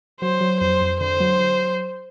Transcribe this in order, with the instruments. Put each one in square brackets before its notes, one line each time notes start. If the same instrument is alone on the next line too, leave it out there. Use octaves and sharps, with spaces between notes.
[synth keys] F#3 [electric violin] C5
[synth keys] F#3
[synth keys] F2 [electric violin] C5
[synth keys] F2
[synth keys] D3 [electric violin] C5
[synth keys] F#3
F#3